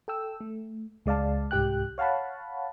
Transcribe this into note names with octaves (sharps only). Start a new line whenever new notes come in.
A4 G5 E6
A3
C#2 G#3 D5 F5 A5
C2 G#2 G4 G5 F#6
C#5 F5 F#5 A5 B5